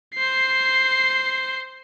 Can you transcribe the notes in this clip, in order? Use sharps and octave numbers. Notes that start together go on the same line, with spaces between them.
C5 C7